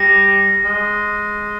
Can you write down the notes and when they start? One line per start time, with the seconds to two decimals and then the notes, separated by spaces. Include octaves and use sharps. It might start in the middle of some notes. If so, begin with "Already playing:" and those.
Already playing: G3 A#6
0.65 G#3